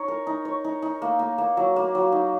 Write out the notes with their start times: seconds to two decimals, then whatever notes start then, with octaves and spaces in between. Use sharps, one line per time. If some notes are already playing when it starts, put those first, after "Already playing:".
Already playing: D#4 C#5
0.08 A#4
0.27 D#4
0.45 C#5
0.64 D#4
0.82 D#4
1.02 A#3
1.19 A#3
1.38 A#3
1.57 F#3
1.76 A#3
1.95 F#3
2.12 D#4